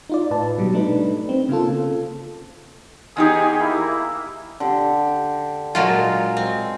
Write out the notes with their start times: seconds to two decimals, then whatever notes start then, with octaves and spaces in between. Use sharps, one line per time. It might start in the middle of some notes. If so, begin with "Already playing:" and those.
0.09 D#4 F4 D5
0.31 A2 B4 A5
0.58 B2 F#3 G3
0.74 A3 D4 D#4 B4
1.29 C4
1.49 C#3 A#3 F4 A4
3.17 E2 D#4 G4 G#4
3.58 A#3 E4
4.60 D3 G4
5.75 A#2 F#3 G#3 F4
6.37 C4